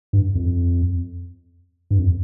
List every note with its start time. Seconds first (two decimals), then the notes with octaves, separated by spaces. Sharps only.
0.13 G2
0.35 F2
1.91 G2
1.98 F2